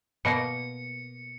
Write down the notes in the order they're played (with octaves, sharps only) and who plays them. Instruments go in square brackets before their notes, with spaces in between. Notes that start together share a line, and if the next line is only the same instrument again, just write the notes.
[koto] B2 A#3 [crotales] C#7